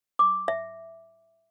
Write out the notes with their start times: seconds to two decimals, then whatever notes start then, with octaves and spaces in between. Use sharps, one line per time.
0.19 D6
0.48 E5